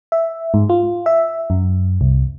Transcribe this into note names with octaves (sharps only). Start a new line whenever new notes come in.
E5
G#2
F4
E5
F#2
C2